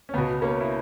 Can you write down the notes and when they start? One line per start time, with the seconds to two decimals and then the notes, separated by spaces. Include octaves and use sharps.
0.09 C#4
0.13 C#2 B3
0.18 B2
0.42 A#3 C#4
0.61 E4